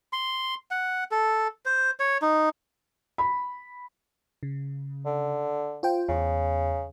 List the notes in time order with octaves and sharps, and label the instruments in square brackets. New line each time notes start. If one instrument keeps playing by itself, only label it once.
[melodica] C6
F#5
A4
C5
C#5
D#4
[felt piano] B5
[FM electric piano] C#3
[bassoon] D3
[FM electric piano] F4 C5 G5
[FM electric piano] E2 [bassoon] C#3